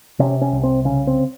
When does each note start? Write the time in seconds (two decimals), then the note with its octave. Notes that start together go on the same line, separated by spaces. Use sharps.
0.19 C3 C#4
0.41 C#4
0.52 C2
0.63 C4
0.85 C#3 C#4
1.07 C4